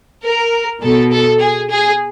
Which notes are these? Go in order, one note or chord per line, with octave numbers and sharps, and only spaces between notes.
A#4
B2 A4
A4
G#4
G#4